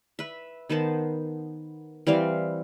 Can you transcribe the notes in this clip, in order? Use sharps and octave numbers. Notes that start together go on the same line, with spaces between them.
B4 E5
D#3 B3 C5 A5
E3 G3 C4 F5